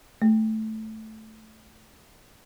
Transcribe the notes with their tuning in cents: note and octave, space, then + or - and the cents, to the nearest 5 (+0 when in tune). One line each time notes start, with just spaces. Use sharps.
A3 -5